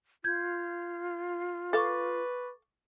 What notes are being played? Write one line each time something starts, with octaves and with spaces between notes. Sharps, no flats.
F4 G6 G#6
A4 B4 F5 C#6 D6 A6